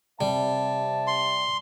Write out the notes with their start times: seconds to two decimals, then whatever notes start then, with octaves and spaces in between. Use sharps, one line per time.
0.21 C3 G3 E5 A5
1.07 C6